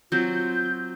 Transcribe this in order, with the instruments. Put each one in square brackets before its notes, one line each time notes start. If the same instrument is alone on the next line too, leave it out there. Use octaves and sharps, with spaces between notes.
[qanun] F#3 C4 [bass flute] F4 [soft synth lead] G6